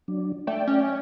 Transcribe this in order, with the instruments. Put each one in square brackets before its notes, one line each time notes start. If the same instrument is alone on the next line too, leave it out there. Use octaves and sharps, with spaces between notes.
[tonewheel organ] F#3 D4
[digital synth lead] A3 [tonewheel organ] D5 G5
[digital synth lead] C#4